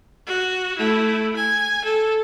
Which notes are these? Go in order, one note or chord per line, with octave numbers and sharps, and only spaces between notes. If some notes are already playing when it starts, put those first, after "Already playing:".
F#4
A3 E4
G#5
A4